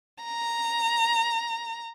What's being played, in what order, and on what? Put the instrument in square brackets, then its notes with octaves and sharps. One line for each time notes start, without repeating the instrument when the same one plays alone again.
[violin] A#5